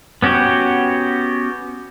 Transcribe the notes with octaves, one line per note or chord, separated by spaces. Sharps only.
B3 C#4 F#4 G4